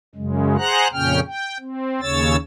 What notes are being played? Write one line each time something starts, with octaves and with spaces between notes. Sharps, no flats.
F#2 C#3 G#3
G#4 C5 F#5 A#5 F#6
F2 A#2 C#3 C#4 G5 F6
G5
C4
D#2 C#3 C#5 E6 A6